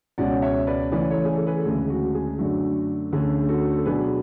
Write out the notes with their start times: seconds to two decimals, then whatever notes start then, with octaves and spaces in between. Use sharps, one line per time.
0.18 C#2 B2 G#3 C#4 D5 F#5
0.42 C#5 E5
0.67 B4 D5
0.92 C#3 E3 A3 C#4 B4 D5
1.10 A4 C#5
1.25 G#4
1.36 A4
1.47 G#4 B4
1.58 A4
1.65 D2 C#3 G#3 G#4
1.90 F#4
2.14 G#4
2.39 F#2 D3 A3 D4 F#4
3.12 D2 D3 A3 C#4 G#4
3.48 F#4 A4
3.78 A4
3.86 B2 F#3 B3 D4 G#4 B4